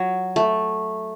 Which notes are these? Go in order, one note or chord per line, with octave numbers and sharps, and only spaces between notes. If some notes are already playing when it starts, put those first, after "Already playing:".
Already playing: F#3
A3